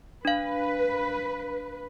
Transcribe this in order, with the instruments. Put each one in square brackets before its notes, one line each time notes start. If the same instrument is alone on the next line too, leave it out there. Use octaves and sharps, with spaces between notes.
[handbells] D4 F5 [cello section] B4